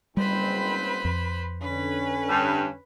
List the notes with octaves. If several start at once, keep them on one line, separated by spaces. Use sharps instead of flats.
F#1 G#2 G3 C4 B4 C5 B5
F2
D3 C#4 B4
G2